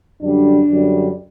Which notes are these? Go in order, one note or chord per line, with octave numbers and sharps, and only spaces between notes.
F#2 D3 G3 D4
F#2 D3 G3